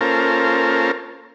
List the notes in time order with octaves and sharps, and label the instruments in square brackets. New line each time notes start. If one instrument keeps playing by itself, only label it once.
[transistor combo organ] A#3 C#4 F4 A4 A#4 C5